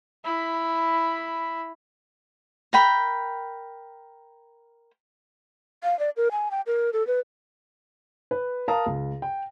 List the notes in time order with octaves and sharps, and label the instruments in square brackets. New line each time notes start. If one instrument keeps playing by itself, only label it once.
[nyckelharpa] E4 B5
[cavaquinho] A#4 G5 B5
[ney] F5
D5
A#4
G#5
G5
A#4
A4
B4
[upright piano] B4
A#4 F5 A5 A#5 D#6
C#2
G5